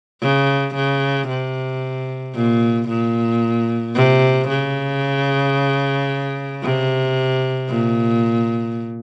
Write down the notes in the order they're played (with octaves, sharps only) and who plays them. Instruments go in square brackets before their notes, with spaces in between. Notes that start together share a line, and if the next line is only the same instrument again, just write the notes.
[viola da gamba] C#3
C#3
C3
A#2
A#2
C3
C#3
C3
A#2